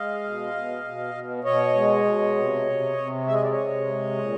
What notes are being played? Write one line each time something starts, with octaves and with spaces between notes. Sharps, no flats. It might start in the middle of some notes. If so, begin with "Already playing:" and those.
Already playing: G#3 D#5 F5
B2
B2
B2
B2
B2 C#5 D#5
G#3
B2
C3
C3
C3
G#3 E5
D#5
D5
C#5 D#5
C3
G#3
A#2